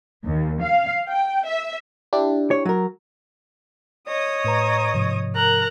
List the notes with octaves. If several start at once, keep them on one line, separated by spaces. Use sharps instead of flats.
D#2
F5
G5
E5
D4 E4 G4
C#5
F#3 A#4
C#5 D#5 D#6
A2 B4 A#5
G#2 C3 F3
A#4 A#5 F#6